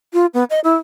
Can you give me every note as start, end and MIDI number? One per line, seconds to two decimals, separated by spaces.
0.13 0.26 65
0.34 0.44 59
0.50 0.60 75
0.64 0.75 64